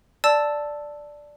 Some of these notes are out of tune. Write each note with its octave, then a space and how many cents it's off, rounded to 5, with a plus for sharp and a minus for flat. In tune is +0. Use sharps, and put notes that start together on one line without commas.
D5 +0 A5 +0 E6 +0